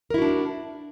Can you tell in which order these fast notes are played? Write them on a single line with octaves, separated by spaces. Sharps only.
A#4 E4 F#4 D4